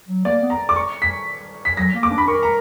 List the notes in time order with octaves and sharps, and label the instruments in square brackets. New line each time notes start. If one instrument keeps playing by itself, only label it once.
[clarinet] F#3
[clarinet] A#3 [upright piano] D5
[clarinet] B3
[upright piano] A#5
D6
C#6
B6
B6
[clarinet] F#3 [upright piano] A#6
[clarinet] A#3
[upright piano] D6
[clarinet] D4
[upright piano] B5
[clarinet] A#4 [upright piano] C#6
[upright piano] A#5